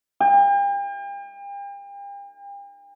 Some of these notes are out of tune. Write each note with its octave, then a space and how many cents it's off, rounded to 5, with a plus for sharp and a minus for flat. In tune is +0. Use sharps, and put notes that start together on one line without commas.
G5 +40